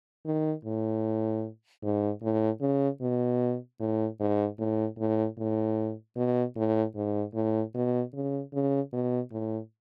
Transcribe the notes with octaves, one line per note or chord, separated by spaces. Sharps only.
D#3
A2
G#2
A2
C#3
B2
A2
G#2
A2
A2
A2
B2
A2
G#2
A2
B2
C#3
C#3
B2
A2